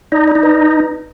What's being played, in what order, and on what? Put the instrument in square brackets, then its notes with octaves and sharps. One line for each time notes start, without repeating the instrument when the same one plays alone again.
[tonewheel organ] D#4 [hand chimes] D5
[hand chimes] D5
[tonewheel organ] D#4
[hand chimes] B4